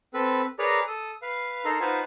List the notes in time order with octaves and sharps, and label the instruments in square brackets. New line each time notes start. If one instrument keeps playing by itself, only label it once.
[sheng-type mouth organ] C4 A4 B4 B5
G#4 A#4 B4 C#5 D5 A#5
A4 D#6
B4 F5
D#4 A4 A#4 A#5 C6
D#4 F4 B4 C5 F#5 G#5